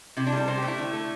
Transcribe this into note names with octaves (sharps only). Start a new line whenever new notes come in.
C3 E4
D4
G3 A4
C3 C5
G4
A3
E4
D3
A3